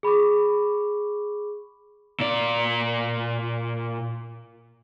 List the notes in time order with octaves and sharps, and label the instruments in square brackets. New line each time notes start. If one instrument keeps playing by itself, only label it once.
[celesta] G#4 B5 C#6 D6
[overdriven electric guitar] A#2 D5